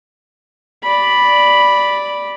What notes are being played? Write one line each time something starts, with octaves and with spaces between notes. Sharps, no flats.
D5 B5